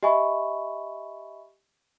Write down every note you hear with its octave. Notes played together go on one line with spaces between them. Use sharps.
G4 D#5 E5 G#5 B5 C#6